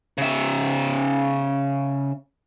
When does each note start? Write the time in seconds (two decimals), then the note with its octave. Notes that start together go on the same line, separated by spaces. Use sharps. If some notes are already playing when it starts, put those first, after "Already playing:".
0.18 C#3 E5